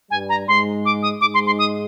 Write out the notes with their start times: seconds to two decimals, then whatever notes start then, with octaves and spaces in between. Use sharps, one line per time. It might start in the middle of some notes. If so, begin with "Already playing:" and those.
0.11 G2 G3 G#5
0.29 A#5
0.47 G#2 G#3 C6
0.85 D6
1.03 D#6
1.21 G#2 G#3 D6
1.34 C6
1.46 C6
1.59 D#6